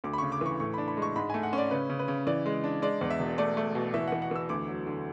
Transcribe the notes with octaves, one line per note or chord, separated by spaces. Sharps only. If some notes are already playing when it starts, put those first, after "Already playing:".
D2 D6
B5
C#3 C#6
D6
E3 C#6
A2 C#6
D4 B5
B5
G#3
C#6
G#2 B5
A3 G#5
F#5
C#4 D5
C#3 B4
C#3
B4
C#3
E3 D5
G#3
D4
G#3 D5
E2
E5
E1
A3 D5
A3
B2
E3 E5
E3 F#5
F#5
E3 E6
D2 D6
F#3
D3